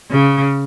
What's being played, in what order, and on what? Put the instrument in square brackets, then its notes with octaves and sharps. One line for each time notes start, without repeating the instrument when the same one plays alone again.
[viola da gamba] C#3